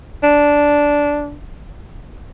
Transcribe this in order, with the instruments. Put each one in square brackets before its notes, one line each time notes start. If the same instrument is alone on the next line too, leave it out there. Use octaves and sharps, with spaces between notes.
[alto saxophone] D4